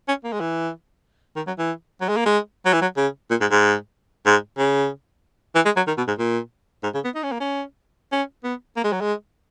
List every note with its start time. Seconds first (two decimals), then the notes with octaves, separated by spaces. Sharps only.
0.08 C#4
0.24 A#3
0.33 G#3
0.40 E3
1.36 D#3
1.47 F#3
1.58 E3
2.01 F#3
2.09 G#3
2.17 A#3
2.26 G#3
2.66 F#3
2.73 E3
2.82 F#3
2.97 C#3
3.30 A#2
3.41 G#2
3.51 G#2
4.26 G#2
4.58 C#3
5.55 E3
5.65 G#3
5.77 F#3
5.87 D#3
5.97 B2
6.08 G#2
6.19 A#2
6.83 G#2
6.94 C#3
7.05 B3
7.15 D#4
7.23 C#4
7.32 A#3
7.40 C#4
8.12 C#4
8.44 B3
8.77 A#3
8.84 G#3
8.92 F#3
9.01 G#3